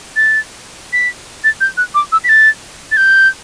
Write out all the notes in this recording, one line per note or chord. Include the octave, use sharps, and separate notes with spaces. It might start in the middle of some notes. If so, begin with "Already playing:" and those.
A6
B6
A6
G6
F#6
D6
E6
B6
A6
A6
G6